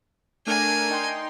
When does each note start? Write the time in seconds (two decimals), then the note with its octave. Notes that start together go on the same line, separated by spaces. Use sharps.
0.47 A3 D4 A#4 G#5
0.90 D#4 G5 C6